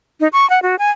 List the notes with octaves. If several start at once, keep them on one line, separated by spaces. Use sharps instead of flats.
D#4
C#6
F#5
F#4
G#5